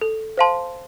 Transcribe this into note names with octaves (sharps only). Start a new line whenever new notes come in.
A4
C5 F5 A5 C6